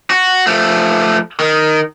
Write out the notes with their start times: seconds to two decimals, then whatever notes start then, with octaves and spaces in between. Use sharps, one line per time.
0.10 F#4
0.47 F3 A3
1.40 D#3